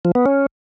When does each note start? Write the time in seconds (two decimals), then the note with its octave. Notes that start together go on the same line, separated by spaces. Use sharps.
0.05 F3
0.15 B3
0.26 C#4